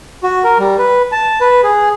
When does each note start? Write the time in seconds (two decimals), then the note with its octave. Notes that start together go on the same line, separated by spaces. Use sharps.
0.23 F#4
0.44 A#4
0.59 G3
0.79 B4
1.12 A5
1.41 B4
1.63 G#4